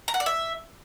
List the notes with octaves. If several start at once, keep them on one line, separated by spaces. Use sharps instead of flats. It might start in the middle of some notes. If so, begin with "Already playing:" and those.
A#5
F#5
D5
E5